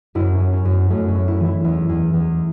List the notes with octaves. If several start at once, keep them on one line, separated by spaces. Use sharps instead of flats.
F#2 E4
C#4
F#2
C#4
F#2
B3
F#2 A3
C#4
F#2
E4
E3
E4
E2 E4
E2
E2